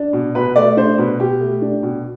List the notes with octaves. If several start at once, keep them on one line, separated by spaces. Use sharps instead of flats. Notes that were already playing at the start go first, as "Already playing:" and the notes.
Already playing: D4
B2
B2 B4
A3 D5
D4 C5
B2 B4
B2 G4
A3
D4
B2